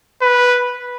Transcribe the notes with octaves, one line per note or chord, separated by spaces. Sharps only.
B4